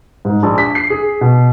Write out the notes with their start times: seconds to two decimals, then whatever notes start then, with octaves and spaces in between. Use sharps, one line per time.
0.25 G#2
0.43 A#1
0.58 B6
0.75 C7
0.90 G#4
1.21 B2